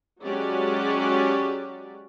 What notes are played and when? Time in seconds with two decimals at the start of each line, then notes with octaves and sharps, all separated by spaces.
0.22 F#3 G#3 C#4 F#4 G4 D5